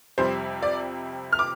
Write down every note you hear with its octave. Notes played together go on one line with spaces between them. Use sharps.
F2 C3 G3 C5
D5
F6
D6